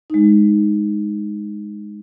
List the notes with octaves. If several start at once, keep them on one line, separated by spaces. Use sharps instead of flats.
G#3 D#4